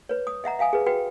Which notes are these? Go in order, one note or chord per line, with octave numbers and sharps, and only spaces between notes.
B4 C#5
D#6
D#5 E5 F#5 A#5
E5 F5 G#5 D#6
G#4 B4
F#4 B4 G5